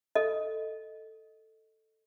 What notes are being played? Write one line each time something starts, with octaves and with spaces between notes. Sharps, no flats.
A4 D#5